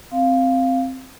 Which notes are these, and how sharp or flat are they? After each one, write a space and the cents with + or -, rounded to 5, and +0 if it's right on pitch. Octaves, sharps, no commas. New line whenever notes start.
C4 +0 F5 -5